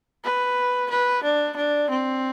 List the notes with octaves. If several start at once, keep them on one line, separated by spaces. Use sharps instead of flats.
B4
B4
D4
D4
C4